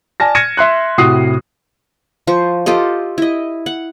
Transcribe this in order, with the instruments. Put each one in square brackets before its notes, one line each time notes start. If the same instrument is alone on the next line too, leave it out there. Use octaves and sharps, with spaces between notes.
[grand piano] D5 G#5 A5 F6 A#6
F6 G#6 A#6 C#7 D#7 E7
E5 C6 F#6
A2 C3 E4 F#4 D#6 C7
[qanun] F3 C5 C#6
F4 G4 A4 D#5
E4 D#5
F#5